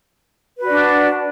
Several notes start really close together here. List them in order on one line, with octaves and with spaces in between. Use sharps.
B4 F#4 D5 D4